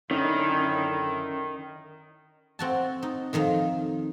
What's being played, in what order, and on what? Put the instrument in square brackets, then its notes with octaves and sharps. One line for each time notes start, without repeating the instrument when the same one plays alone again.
[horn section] F#2 D3 E4 [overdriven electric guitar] D#3 [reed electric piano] C#4
[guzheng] C4 F#4 A5
D#4
F2 D#3 D#4 F5